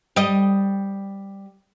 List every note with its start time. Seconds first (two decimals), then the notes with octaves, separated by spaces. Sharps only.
0.16 G3 D#5